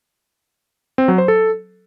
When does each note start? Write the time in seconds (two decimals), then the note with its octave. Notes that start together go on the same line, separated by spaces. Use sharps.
0.98 C4
1.08 F#3
1.18 C5
1.28 A4